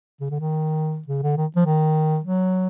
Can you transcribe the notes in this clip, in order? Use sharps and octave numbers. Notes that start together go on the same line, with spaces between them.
C#3
D3
D#3
C#3
D3
D#3
F3
D#3
F#3